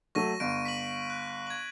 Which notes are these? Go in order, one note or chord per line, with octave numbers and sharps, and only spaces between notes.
F#3 A3 C#6 A#6 D#7
G1 D7
B6 D#7 F#7
F#6
G#6 F#7